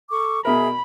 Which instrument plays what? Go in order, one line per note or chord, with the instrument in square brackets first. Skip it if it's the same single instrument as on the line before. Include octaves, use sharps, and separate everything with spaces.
[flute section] A4 C#6 D6
[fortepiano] B2 A#4 [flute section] G#4 E5 [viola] B5